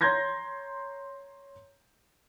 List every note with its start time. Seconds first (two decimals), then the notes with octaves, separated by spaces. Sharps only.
0.01 C#5 A#5 C6 G6 G#6 A#6